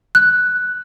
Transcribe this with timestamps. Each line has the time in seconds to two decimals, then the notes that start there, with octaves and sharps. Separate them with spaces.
0.15 F#6